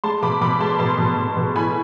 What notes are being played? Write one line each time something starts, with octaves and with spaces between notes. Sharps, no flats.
G#3 A5 C6
B2 B5 D6
B2 B5 D6
G#3 A5 C6
B2 A5 C6
B2
B2
B2
A2 G#5 B5